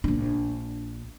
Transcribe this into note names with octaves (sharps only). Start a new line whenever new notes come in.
A#1 D4